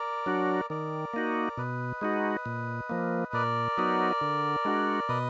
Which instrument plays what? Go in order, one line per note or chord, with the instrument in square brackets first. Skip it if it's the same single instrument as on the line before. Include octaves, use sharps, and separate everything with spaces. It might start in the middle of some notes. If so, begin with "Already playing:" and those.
Already playing: [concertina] A#4 D5
[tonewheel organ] F#3 D4 F#4
[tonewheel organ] D#3 [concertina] A#4 D5
[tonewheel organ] A#3 D#4 F#4
[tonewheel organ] B2 [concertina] B4 D#5
[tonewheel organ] G#3 D#4 F#4
A#2
F3 A#3
[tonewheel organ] A#2 [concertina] A#4 D5
[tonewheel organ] F#3 B3 D#4 F#4
D3
G#3 D4 F#4
[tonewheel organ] B2 [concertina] B4 D#5